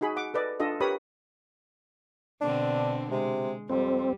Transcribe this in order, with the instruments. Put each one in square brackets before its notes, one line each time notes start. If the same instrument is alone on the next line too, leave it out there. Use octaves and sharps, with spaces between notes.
[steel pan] D#4 F#4 G#4 B5
F#5 D6
A4 B4 D5 D#5
D4 F4 A4 D#5
G4 A#4 B4 C#5 B5 D#6
[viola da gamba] B2 D3 C4 [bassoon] D4
[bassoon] C3 [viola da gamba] G#3
[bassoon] F2 [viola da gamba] G3 [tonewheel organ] C4